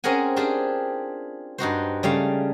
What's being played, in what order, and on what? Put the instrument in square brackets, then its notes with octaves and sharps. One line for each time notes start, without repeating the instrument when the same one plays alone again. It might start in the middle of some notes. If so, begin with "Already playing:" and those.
[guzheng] C4 C#4 G#4 A#4 F#5 G#5
C4 D4 F4 G4 G#4
G2 D#4 F#4 C5
C#3 G3 A3 F5